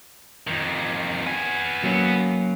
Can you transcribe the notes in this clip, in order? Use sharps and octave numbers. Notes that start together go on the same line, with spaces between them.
F2 D#3
B3 G#5
F#3 A#3 C#4